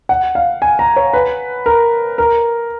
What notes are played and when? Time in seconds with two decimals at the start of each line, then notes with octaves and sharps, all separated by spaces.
0.09 F#5
0.35 F5
0.62 G#5
0.79 A#5
0.96 C#5
1.13 B4
1.66 A#4
2.18 A#4